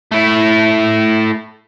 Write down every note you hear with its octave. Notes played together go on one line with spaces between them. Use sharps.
A3 E4